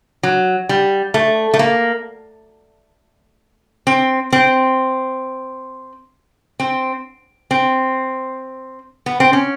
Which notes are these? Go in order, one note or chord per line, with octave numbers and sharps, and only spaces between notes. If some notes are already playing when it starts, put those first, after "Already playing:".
F#3
G3
A3
A3
A#3
C4
C4
C4
C4
B3
C4
C#4